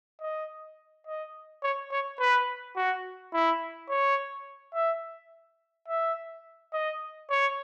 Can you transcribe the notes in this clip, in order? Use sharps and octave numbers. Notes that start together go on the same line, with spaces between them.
D#5
D#5
C#5
C#5
B4
F#4
E4
C#5
E5
E5
D#5
C#5